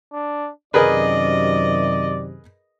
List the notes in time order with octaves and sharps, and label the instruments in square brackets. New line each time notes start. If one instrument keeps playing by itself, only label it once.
[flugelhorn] D4
[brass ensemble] F#2 C3 D#3 [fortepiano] G#4 A#4 B4 [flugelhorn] D5 [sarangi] D#5